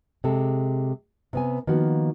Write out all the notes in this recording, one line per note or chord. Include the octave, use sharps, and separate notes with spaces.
C3 G#3 A4
C3 B3 G#5
D#3 F3 A#3 B3 F#4